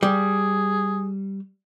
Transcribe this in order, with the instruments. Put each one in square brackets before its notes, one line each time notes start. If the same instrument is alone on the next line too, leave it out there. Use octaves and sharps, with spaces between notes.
[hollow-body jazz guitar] G3 [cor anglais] G#4